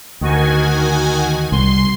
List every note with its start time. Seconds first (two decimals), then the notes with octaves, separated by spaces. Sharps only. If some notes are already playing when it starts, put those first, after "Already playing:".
0.21 D2 D#3 F#4 G#5
1.52 C2 C6